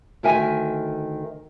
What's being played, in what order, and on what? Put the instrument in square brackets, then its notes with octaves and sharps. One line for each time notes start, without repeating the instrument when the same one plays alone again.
[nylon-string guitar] D2 D#3 A#4 E5 G#5